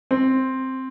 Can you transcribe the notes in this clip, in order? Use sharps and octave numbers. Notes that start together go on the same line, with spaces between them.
C4